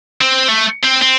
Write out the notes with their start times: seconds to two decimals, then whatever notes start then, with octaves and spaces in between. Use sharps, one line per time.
0.21 C4
0.49 A3
0.84 C4
1.02 C4